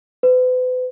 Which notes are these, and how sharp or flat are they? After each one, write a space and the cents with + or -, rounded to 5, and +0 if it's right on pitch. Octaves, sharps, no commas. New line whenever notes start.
B4 +40